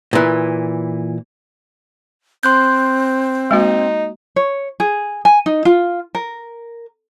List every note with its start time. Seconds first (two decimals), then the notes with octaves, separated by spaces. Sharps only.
0.13 A#2 E3
2.43 C4 C6 F#6 G6
3.51 G#3 A#3 D#4 F#4
4.36 C#5
4.80 G#4
5.25 G#5
5.46 D#4
5.65 F4
6.15 A#4